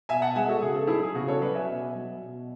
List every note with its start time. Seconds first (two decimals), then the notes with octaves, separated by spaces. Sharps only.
0.09 B2 E5 G#5
0.22 F#5 A5
0.36 G#3 E5 G#5
0.48 F#4 A4
0.62 C#3 G#4
0.75 A4
0.87 F#3 E4 G#4
1.03 G#4
1.15 C#3 F#4
1.28 A4 C#5
1.41 F#3 B4 D5
1.55 E5 G#5
1.68 B2
1.95 F#3
2.22 B2